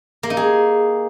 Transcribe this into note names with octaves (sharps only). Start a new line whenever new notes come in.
A#3
D#4
G#4